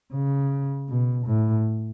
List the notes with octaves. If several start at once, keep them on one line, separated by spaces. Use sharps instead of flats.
C#3
B2
A2